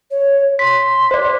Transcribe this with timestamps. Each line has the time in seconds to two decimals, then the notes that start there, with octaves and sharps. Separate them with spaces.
0.11 C#5
0.59 C6 B6
1.11 C5 D5